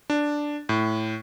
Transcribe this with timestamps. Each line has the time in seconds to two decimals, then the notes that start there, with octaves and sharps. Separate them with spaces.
0.10 D4
0.69 A2